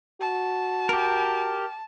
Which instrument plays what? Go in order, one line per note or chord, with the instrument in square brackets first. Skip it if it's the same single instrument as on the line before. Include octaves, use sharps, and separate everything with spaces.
[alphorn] F#4 [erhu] A5
[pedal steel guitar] G4 A#4